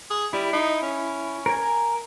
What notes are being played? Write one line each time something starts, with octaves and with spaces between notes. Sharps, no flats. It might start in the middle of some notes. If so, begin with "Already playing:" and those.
G#4
G3 E4
D#4
C#4
A#4 G#5